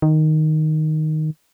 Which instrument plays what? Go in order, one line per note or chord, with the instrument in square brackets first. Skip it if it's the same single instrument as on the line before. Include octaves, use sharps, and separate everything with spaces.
[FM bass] D#3